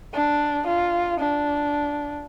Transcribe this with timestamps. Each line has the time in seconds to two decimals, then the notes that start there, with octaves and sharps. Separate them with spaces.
0.14 D4
0.67 F4
1.20 D4